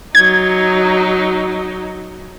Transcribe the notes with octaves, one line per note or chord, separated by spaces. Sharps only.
F#3 D#4 G#6